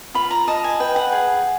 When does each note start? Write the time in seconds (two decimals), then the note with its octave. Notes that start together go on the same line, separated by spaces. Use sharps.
0.14 F4 B5
0.31 A#5
0.47 D#5 A5
0.64 G#5
0.80 B4 G5
0.96 F#5
1.12 G#4